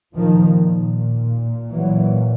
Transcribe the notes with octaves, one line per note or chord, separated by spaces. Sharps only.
A#2 D#3 F3
E3 F#3